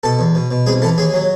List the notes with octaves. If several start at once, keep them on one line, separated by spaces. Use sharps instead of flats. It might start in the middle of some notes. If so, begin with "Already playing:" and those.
B2 A4 A5
E2
B2
B2
C2 G#4 G#5
E3 A4 A5
D#2 G#4 G#5
F#3